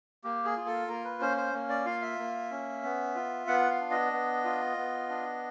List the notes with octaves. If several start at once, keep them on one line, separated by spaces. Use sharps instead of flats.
A#3 G4
G#4
F4
A4
A#3 A#4
B4
C#4 C5
C5
A#3
D5
F4 F5
E5
A#3
C#4
B3
F4
B3 F#5
F5
D4
D#5
B3
F4
B3
D4